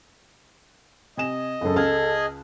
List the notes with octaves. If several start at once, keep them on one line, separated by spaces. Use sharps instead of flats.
C3 D#5 G#5 E7
F#1 F#2 A4
C#2 G#4 D#5 A5 F6